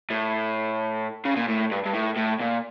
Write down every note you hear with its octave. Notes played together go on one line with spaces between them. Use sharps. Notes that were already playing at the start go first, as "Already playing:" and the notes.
A2
C#3
A#2
A2
G2
G2
A2
A2
A#2